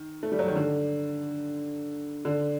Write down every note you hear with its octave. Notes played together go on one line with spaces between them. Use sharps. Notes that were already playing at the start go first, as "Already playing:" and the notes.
Already playing: D#3
A3
G3
F#3
D#3
D3
D3